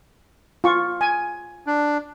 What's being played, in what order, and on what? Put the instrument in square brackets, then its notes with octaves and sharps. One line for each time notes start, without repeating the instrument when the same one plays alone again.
[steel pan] F4 C#6
G#5
[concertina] D4